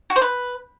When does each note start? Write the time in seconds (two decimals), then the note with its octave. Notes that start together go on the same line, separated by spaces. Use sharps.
0.10 F#4
0.16 C5
0.22 B4